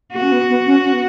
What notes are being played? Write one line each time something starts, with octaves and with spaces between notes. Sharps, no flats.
A#3 F#4
C#4
B3
B3
C#4
C#4
B3